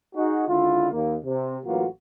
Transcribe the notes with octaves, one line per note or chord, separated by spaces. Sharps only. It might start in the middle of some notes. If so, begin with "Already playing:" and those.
D#4 F#4 G#4
C#2 D3 E4 F4
D#2 A#3
C3
A1 E3 F#3 A#3 F4 F#4